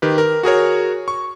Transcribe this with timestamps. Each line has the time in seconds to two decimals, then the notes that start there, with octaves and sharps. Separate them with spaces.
0.02 D#3 G4 B4
0.18 A#4
0.43 F#4 G#4 A#4 C#5
1.08 C#6